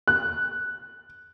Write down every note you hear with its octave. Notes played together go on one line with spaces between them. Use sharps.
F#6